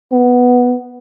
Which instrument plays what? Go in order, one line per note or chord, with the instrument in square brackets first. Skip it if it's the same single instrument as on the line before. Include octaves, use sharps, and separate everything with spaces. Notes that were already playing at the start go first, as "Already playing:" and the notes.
[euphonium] B3